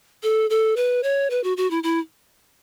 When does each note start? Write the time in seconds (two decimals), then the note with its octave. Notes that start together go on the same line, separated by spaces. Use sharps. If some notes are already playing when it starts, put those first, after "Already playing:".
0.23 A4
0.50 A4
0.76 B4
1.03 C#5
1.30 B4
1.44 F#4
1.57 F#4
1.71 E4
1.83 E4